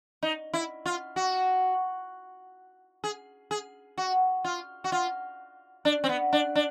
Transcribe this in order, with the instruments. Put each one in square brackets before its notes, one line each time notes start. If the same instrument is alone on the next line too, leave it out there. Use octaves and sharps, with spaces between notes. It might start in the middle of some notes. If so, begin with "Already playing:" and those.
[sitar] D#4
E4
F4
F#4
G#4
G#4
F#4
F4
F#4
F4
D4
C4
B3
D4
D4